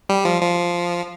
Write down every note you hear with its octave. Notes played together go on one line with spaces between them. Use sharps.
G3
F3
F3